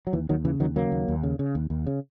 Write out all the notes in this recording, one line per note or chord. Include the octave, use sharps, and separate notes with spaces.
F#3
D#2 E3
D#2 D#3 F#3
C#3 E3
D#2 D#3 F#3
C#3 F#3 A#3
D#2
D#2
C#3
C#3
D#2
D#2
C#3